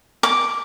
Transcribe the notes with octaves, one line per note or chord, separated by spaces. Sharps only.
D6